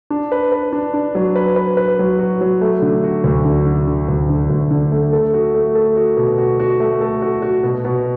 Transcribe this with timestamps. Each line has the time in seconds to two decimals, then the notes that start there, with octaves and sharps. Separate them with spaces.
0.10 D4
0.32 B4
0.52 B4
0.73 D4
0.94 D4
1.15 F#3
1.36 B4
1.56 B4
1.77 B4
1.99 F#3
2.19 F#4
2.41 F#3
2.61 A3
2.82 D3
3.04 F#4
3.24 D2
3.45 D3
3.66 D3
3.87 D3
4.08 D2
4.29 D3
4.50 D2
4.71 D3
4.92 A3
5.13 A4
5.34 F#4
5.54 A3
5.75 A4
5.97 F#4
6.17 B2
6.38 F#4
6.60 F#4
6.80 A3
7.01 A4
7.22 F#4
7.42 F#4
7.63 B2
7.85 B2